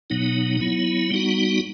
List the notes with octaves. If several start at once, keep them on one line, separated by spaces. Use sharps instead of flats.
B2 F#3 B3 D#4
F#3 B3 E4
G3 B3 D#4 F#4